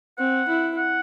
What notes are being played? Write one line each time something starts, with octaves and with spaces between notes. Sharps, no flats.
C4 F#5
E4
F#5